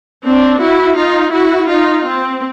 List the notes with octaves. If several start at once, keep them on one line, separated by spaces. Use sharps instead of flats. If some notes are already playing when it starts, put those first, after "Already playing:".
C4 D4
E4 F#4
D#4 F4
E4 F#4
D#4 F4
C4